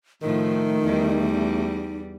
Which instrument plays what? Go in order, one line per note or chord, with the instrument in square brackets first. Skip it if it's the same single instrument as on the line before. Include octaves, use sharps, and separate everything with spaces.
[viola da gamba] A2 F3 [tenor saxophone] D#3 [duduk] A3 [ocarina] D#4
[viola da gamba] E2 G3